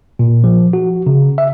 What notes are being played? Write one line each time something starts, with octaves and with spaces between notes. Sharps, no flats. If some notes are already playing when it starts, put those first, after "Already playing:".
A#2
F3
F#4
C#3
E5